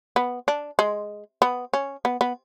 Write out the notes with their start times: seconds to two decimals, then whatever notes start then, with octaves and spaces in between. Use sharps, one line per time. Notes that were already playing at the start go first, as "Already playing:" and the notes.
0.16 B3
0.48 D4
0.79 G#3
1.42 B3
1.74 C#4
2.05 B3
2.21 B3